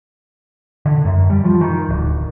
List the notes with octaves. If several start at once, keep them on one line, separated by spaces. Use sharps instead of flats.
D3
F#2
G3
F3
D#3
D1